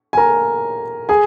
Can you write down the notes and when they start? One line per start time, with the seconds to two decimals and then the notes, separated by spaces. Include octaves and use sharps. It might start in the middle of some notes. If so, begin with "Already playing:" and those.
0.13 G#5
0.17 A#4 A#5
1.09 G#4 G#5